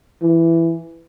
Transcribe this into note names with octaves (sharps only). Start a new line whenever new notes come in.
E3